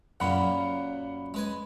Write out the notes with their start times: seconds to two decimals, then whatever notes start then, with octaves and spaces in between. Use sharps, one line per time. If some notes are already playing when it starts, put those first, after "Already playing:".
0.20 F#2 A#2 C#3 A#3 F#5 B5
1.34 G#3 B4 G#5